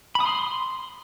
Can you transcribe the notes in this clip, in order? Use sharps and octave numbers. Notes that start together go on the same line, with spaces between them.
B5
D#6
C6